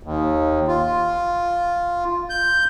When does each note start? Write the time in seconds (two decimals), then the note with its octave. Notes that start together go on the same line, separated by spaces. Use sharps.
0.03 D#2
0.68 F4
2.30 G6